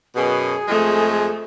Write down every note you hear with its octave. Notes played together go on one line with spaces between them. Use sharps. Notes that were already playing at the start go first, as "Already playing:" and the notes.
F#2 B2 G#4
F2 G#3 A3